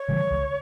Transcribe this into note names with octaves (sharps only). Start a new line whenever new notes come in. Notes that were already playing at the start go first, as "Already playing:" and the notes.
Already playing: C#5
C#3 E3 G3
C#2